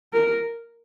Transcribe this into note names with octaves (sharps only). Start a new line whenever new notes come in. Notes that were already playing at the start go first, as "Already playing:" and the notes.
A#4